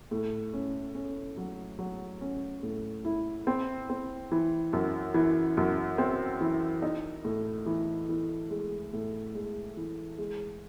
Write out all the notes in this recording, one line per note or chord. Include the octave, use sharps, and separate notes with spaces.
A2
C#4
C#4
F#3
F#3
C#4
A2
E4
C4
C4
E3
F#2
E3
F#2
C4
E3
D#4
A2
E3
E3
G#3
A2
G#3
E3
G#3